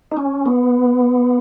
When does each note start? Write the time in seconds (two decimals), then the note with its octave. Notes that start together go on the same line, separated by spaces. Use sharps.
0.12 D#4
0.17 C#4
0.46 B3